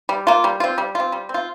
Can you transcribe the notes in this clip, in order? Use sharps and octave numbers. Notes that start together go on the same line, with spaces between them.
G3
A#3 F4
G3
C4 F4
G3
C4 F4
G3
C4
F4